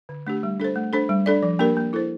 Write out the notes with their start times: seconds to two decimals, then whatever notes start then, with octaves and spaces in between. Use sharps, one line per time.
0.09 D3
0.27 A3 D4 G4
0.43 G3
0.60 D4 A4 C5
0.75 A3
0.93 D4 A4 C5
1.09 G3
1.26 D4 A4 D5
1.43 F3
1.59 A#3 D4 G4 A#4
1.77 A#3
1.93 E4 A4 C5